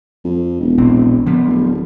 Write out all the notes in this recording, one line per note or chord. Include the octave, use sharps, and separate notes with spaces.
F2
E1
A#1 C4
D3 F3 B3
D1